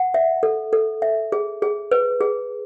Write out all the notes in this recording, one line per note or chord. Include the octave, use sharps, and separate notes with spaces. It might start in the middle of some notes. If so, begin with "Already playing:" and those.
Already playing: F#5
E5
A4
A4
E5
G#4
G#4
B4
G#4